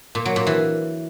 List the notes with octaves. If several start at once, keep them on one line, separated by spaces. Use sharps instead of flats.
A#2
F#3
A#2
E3